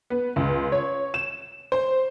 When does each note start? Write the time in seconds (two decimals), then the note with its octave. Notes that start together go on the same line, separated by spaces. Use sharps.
0.10 B3
0.36 C#2
0.72 C#5
1.14 E7
1.72 C5